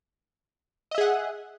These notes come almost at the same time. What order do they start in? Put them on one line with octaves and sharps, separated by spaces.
D#5 E5 G#4 F#5